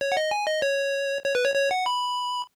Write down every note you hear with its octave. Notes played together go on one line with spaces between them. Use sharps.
C#5
F#5
D#5
G#5
D#5
C#5
C#5
B4
C#5
C#5
F#5
B5